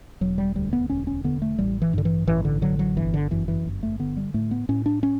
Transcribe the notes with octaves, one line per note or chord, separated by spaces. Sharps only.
E1 F#3
G3
D2 G3
B3
E1 C#4
C#4
D3 B3
A3
A1 G3
E3
G2 D3
E3
A1 E3
D3
D3 F#3
F#3
G1 E3
D3
F#2 E3
E3
G1
A3
D3 B3
G3
A2 A3
B3
A2 C#4
D4
C#4